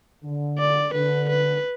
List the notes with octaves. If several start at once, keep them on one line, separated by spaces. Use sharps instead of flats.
D3
D5
D3 B4
B4